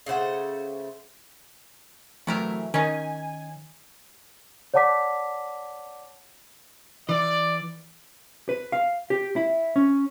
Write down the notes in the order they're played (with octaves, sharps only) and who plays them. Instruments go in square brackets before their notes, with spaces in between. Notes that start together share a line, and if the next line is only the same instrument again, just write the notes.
[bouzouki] C#3 A3 C5 F#5
[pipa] C3 E4 A#4 [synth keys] E3 F#3 A3
[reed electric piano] D#3 [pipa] C#4 D#4 [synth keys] G#5
[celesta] C#5 D5 F#5 A5 D6 B6
[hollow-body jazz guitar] E3 [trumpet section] D5
[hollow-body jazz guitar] B4
F5
G4
E4
C#4